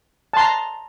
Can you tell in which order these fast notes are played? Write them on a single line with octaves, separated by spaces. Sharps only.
A5 C6 A#5